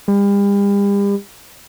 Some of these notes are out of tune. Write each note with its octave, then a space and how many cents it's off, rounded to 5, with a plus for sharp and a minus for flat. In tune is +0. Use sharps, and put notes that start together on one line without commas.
G3 +40